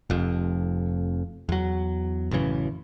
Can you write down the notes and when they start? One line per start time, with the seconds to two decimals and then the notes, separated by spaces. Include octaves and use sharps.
0.10 F1 F2
1.49 E2 F#3
2.31 A1 F#2 C#3 E3